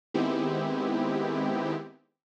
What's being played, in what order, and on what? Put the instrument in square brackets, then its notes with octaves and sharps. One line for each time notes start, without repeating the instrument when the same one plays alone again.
[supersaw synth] D#3 G#3 B3 C4 E4 G4